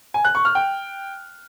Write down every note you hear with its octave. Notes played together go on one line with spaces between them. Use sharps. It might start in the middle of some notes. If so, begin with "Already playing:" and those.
G#5
F#6
C#6
F6
G5